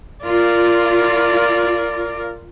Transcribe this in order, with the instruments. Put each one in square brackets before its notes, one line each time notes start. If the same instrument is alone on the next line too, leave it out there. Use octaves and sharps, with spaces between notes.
[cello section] F4 [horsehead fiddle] A#4 D5